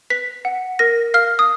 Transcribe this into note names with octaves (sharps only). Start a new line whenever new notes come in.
B4 B6
F#5
A#4 A#6
F5 F6
D#6